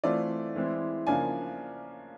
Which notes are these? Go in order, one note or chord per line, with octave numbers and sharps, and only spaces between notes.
E3 A3 C4 F4 D5
E3 G#3 C4 E4
C#3 F3 A#3 D4 G#5